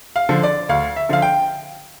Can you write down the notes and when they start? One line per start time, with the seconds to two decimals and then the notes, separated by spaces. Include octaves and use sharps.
0.16 F5
0.29 D3 F3
0.43 D5
0.69 D2 F5
0.96 E5
1.09 D3 F3 F5
1.22 G5